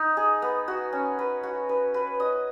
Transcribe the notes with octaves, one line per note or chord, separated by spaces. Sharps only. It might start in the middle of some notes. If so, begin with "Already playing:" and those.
Already playing: D#4
G#4
B3
F#4
C#4
B4
F#4
B4
B4
D#5